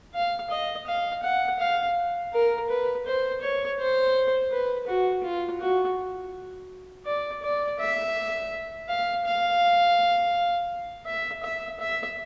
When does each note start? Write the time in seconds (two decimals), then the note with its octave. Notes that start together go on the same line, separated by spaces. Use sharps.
0.14 F5
0.50 D#5
0.87 F5
1.23 F#5
1.60 F5
2.33 A#4
2.70 B4
3.06 C5
3.41 C#5
3.79 C5
4.51 B4
4.87 F#4
5.23 F4
5.60 F#4
7.06 D5
7.42 D5
7.79 E5
8.89 F5
9.25 F5
11.06 E5
11.43 E5
11.80 E5